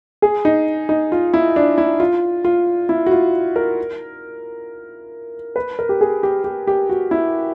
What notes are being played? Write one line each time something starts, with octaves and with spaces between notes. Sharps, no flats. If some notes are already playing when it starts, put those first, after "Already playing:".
G#4
D#4
D#4
F4
E4
D4
E4
F4
F4
E4
F#4
F4
A#4
B4
A#4
G4
G#4
G4
G4
G4
F#4
E4